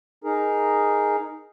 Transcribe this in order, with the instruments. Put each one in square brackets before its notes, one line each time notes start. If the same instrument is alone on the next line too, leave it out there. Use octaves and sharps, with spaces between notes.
[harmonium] D#4 G#4 A#4